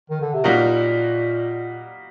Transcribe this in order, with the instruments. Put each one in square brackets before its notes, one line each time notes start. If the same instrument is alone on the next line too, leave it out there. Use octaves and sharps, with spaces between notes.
[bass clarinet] D#3
D3
C3
[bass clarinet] A#2 [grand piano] G3 A#3 D#4 F#4 A#4